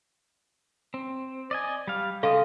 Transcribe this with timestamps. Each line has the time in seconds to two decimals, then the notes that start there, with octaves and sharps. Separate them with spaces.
0.94 C4
1.51 D5 D#5 G#5
1.88 G3 F5
2.23 C#3 G#3 A4 D#5 F5 C6